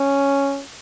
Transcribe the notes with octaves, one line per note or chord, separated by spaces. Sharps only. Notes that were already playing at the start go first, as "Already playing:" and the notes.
Already playing: C#4